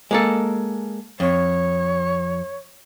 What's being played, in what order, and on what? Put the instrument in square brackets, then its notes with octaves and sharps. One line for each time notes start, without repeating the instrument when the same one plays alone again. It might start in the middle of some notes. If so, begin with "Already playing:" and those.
[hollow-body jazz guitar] G#3 A#3 A4
[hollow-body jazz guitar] F2 [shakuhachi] C#5